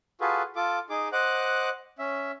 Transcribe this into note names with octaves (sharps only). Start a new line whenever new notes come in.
F4 F#4 G#4 A4 B4
F4 A4 D6
D#4 G#4 D6
C5 D#5 F#5 D6 F#6
C#4 E5